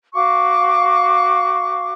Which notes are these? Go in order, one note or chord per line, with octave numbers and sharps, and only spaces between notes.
F#4 F5 C#6 D6